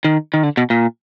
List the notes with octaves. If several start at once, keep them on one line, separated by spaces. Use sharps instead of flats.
D#3
D#3
D3
B2
A#2